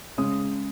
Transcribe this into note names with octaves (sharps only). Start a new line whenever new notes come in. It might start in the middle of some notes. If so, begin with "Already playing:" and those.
C#3 G#3 C#4 D#6